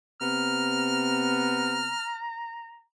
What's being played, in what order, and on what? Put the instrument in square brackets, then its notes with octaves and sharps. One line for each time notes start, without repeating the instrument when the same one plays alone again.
[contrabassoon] C3 [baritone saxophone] B3 [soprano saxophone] A#5 [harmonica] F6